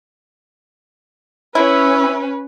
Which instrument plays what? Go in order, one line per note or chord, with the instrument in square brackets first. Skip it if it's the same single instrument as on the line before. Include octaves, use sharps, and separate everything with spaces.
[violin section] C#4 [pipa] E4 [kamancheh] B4